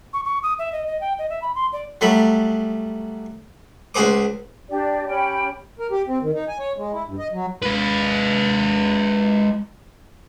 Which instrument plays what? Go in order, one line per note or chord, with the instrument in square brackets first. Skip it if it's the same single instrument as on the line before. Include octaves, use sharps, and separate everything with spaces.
[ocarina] C#6
C#6
D#6
E5
D#5
D#5
G5
D#5
E5
B5
C6
D5
[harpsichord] F#3 G3 A3 B5
C#2 F#4 G#4 C5 D6
[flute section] D4 G4 D5
C#4 G4 G5 B5
[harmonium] A#4
G4
C4
D#3
D#4
G#5
C#5
G#3
E4
G2
D#5
F#3
[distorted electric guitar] G#3 B4